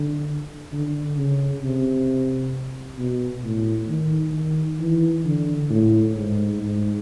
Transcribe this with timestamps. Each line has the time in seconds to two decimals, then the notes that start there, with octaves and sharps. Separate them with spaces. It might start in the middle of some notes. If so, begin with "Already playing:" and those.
Already playing: D3
0.72 D3
1.17 C#3
1.62 C3
2.99 B2
3.44 A2
3.89 D#3
4.34 D#3
4.80 E3
5.25 D3
5.70 A2
6.16 G#2
6.61 G#2